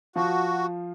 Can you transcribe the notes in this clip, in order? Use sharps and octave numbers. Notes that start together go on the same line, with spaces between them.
F3 F4 F#4